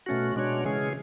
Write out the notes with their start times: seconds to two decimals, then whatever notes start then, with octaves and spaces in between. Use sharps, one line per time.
0.06 B2 A3 C#4 F#4
0.36 B2 G#3 D4 F#4 C#5
0.65 C#3 E3 G#3 C#4 G#4